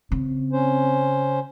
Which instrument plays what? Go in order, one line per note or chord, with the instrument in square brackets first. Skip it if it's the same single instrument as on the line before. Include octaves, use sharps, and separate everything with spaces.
[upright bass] C#3 [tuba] C4
[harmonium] C#4 C5